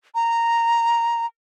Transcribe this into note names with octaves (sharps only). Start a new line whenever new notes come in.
A#5